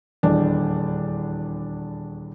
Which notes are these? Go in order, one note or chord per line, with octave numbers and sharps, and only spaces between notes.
D#1 E2 D4